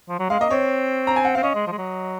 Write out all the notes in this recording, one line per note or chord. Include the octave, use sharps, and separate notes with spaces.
F3
F#3
G#3 F5
A#3 D#5
C4 C#5
A#5
G#5
F#5
C4 F5
C#4 D#5
G#3
F3
G#3
F#3